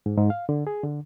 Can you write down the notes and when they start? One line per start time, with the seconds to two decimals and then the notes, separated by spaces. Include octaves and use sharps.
0.06 G#2
0.17 G#2
0.30 F5
0.49 D3
0.67 G#4
0.83 D3